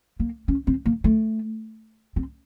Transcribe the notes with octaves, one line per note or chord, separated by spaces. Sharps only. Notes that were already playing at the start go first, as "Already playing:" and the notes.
A#3
C#4
C4
A#3
A3
C4